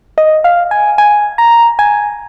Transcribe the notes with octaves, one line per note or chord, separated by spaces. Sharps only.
D#5
F5
G#5
G#5
A#5
G#5